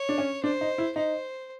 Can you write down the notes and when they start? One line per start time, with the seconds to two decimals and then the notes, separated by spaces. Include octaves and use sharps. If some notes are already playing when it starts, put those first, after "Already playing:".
Already playing: C#5
0.09 D4
0.18 C#4
0.44 D4 C5
0.61 D#4
0.78 E4
0.96 D#4 C5